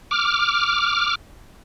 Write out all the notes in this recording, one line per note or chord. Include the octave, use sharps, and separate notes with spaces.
D6 F6